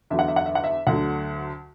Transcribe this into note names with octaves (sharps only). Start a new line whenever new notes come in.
E2 D3 F#3 E5
F#5
E5
F#5
E5
F#5
E5
D2 D3 F#3 F#5